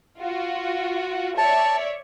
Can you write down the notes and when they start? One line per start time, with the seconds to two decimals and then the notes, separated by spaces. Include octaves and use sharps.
0.19 F4 F#4
1.38 C#5 D5 E5 A5